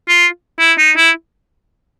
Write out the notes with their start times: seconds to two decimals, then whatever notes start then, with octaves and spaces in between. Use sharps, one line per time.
0.09 F4
0.59 E4
0.78 D#4
0.97 E4